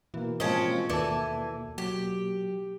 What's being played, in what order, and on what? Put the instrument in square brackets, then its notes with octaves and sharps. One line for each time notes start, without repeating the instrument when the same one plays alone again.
[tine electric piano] B2 A#3 [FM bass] E3
[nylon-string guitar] F3 G#3 D#5 [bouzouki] C4 C#4
[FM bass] D#2 [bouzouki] E3 [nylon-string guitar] A4 D5
[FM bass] F#3 [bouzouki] G4